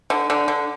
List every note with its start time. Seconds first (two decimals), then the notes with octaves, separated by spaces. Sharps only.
0.10 D3
0.30 D3
0.48 D3